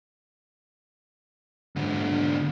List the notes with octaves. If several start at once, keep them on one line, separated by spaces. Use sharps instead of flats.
G#2 D3